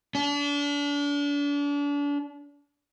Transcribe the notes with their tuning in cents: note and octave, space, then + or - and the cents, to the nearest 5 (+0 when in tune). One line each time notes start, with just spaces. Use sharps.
D4 -35